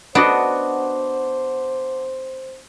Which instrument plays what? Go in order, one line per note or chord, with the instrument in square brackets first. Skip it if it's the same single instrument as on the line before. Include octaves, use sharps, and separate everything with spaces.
[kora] B3 F#4 D#5 [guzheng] D4 [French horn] C5 [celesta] F#5 A5 D6